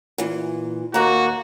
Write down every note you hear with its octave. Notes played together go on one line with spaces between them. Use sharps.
A#2 E3
D#2 A#3 F#4 A#5